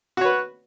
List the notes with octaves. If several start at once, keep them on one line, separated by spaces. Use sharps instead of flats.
F#4 B4 C#5